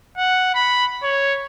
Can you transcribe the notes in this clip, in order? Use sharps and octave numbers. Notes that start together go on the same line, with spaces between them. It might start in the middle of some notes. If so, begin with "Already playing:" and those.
F#5
B5
C#5